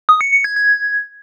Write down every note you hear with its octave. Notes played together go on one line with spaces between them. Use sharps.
D#6
C#7
C#7
G#6
G#6